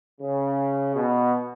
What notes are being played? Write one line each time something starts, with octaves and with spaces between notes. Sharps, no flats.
C#3
B2